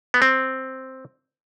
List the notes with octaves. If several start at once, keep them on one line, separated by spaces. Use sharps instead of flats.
B3
C4